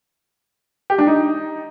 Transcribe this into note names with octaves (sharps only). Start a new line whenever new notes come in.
G4
D4
D#4